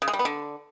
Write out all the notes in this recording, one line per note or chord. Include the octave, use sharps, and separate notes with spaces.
C#3
G#3
G3
B3
D3